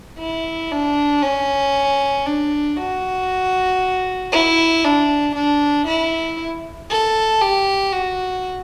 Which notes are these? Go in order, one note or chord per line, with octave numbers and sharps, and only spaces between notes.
E4
D4
C#4
D4
F#4
E4
D4
D4
E4
A4
G4
F#4